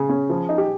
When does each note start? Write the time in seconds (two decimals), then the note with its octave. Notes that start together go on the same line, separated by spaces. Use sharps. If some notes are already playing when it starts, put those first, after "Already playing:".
Already playing: C#3 G#4
0.09 C#4
0.30 F3
0.49 D#4
0.58 G4